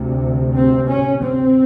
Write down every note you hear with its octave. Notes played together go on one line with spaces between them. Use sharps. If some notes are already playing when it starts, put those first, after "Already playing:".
Already playing: D2 C3
C4
C#4
C4